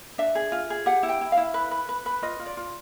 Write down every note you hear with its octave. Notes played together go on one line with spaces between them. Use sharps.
D4 E5
G#4
F4
G#4
G4 F#5
E4
G5
E4
F5
E4
B4
B4
B4
B4
F4 D#5
F4
D5
F4